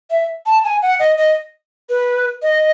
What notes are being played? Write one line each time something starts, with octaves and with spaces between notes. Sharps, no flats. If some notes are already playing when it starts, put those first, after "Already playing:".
E5
A5
G#5
F#5
D#5
D#5
B4
D#5